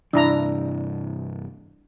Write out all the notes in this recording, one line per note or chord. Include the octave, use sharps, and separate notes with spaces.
G2 C3 E3 D4 E4 A#5